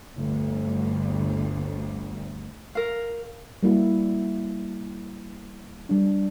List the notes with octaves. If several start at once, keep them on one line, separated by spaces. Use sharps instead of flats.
G1 D2
A#4 F5
G3 A#3 E4 F#4
G3 D4